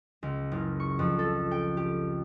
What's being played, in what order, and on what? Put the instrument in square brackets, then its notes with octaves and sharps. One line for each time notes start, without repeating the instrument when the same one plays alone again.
[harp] C#2
F#1
C#6
F2
A4
G5
G4